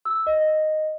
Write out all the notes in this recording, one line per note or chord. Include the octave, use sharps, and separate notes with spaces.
E6
D#5